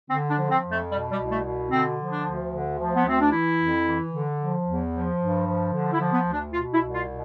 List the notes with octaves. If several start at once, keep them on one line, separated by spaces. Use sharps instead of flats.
D3 C4
D4
F3
C4
F2
A3
B2 G3
G3
C2
A3
B2
D3 C4
F3
D4
D2
D3
F3
B3
D2 C4
D4
E3 E4
F2
E3
D3
F3
E2
F3
G2
F3
D3
E4
F3
B3
D2
D4
B2 F4
E4
C2
F4
B2